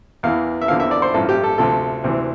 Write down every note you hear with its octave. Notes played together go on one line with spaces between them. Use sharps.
E2 E3 F5
E5
E2 D3 F3 F5
E5
D5
C5
A1 G2 F3 A4
G4
A4
D2 C3 F3 A4
D2 C3 E3